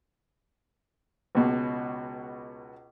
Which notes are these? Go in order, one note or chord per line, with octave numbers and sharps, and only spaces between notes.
C#2 B2